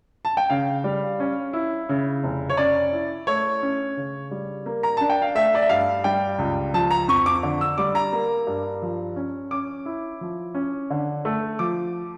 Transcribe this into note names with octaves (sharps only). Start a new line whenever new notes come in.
A5
G5
C#3 F5
G3
C#4
E4
C#3
F1
C#5
C#4 D5
E4
A3 C#5
C#4
C#3
G3
A#3
A#5
D4 A5
G5
F5
A3 E5
D5
E5
G2 F5
G3 G5
C#2
F3 A5
A#5
F2 C#6
D6
D3
E6
G3 D6
A#5
A#3
G2
F3
C#4
C#4 D6
E4
F3
C#4
D3
A3
F3 D6